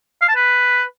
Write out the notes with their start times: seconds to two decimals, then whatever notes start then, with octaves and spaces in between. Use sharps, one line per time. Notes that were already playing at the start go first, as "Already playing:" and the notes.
0.22 F5
0.29 A5
0.36 B4